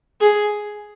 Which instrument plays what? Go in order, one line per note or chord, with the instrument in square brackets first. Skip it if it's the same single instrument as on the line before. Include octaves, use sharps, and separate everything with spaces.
[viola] G#4